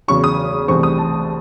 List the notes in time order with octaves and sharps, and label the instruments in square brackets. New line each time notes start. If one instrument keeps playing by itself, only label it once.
[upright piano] E2 C#3 F#3 C#6
D#6
C2 C3 E3 A3 C4 C#6
D#6
A5